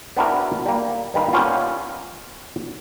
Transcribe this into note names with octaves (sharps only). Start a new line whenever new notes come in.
B3 C4 D4 E4 F#4 A#4
G3 A#3
G2 D#3 B4 F5
G3 A#3 B3 C#4 F4